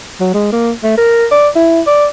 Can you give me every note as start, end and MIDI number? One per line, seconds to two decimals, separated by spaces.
0.20 0.30 54
0.34 0.51 56
0.52 0.71 58
0.83 0.94 57
0.97 1.26 70
1.31 1.48 74
1.56 1.81 64
1.87 2.07 74